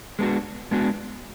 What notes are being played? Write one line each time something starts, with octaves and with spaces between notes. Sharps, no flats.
G#3 B3 D4 F#4
G#3 B3 D4 F#4